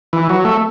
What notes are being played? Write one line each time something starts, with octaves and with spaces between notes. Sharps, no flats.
E3
F#3
A3